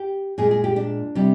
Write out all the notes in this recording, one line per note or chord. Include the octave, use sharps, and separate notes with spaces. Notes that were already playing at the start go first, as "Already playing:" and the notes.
Already playing: G4
A#2 G#3 G#4
G#4
G4
D4
C3 G3